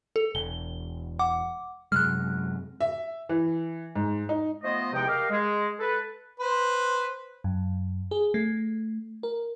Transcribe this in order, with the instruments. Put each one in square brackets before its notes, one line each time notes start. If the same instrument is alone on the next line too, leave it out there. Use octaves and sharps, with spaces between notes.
[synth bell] A4
[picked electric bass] E1 [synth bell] G7
[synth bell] F#5 D6
[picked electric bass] F#2 C3 G#3 [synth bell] F6 F#6
[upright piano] E5
E3
G#2
D#4
[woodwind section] F3 A3 B3 C5 D#5
E2 C3 F3 G#3 D#4 G5
G4 A#4 D#5 F5
G#3
A4 B4
[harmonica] B4 C5
[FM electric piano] F#2
G#4
A3
A#4